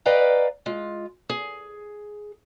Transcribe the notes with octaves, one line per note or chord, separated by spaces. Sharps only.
B4 D5 D#5 F5 G5 A#5
G#3 F4
G#4